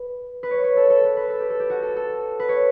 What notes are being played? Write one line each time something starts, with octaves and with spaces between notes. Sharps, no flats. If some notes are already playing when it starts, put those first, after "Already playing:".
Already playing: B4
B4
C#5
C#5
A4
A4
B4
B4
A4
G4
A4
G4
F#4
A4
A4
B4
C#5